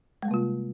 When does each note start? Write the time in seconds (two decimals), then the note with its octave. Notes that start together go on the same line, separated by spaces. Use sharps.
0.22 G#3
0.25 G3
0.28 A#3
0.31 C3
0.34 F4